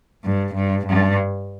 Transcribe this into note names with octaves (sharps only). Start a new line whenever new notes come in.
G2
G2
G2